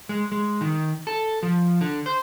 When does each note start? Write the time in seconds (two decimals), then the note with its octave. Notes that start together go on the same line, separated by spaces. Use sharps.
0.09 G#3
0.32 G#3
0.61 D#3
1.07 A4
1.43 F3
1.81 D3
2.06 C5